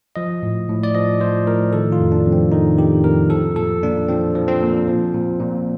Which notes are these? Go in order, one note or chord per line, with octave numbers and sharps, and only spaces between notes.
F3 D#5
A2
A2
D5
F3 D#5
F3 C5
A2 A#4
D#3 A4
F4
F2
D4
F2
C4
D#3 D#4
D#3 G4
F2 A#4
F3 A4
A#2 A4
A#2 D4
F3 C4
F3
C4
A#2
F3
A#2
A#2